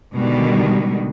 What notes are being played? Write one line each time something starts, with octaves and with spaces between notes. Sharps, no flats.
B2 D3 D#3 G3 G#3